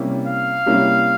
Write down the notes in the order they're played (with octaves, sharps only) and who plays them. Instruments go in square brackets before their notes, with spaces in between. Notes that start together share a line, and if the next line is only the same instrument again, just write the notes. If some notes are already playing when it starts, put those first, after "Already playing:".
Already playing: [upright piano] C3 G3 A#3 C#4 E4
[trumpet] F5
[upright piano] C3 G3 A#3 C#4 E4